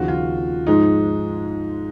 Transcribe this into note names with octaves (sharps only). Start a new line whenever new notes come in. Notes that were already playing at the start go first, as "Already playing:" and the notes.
Already playing: D#2 C#3 F3 F#4
F4
G#2 F3 G#3 D#4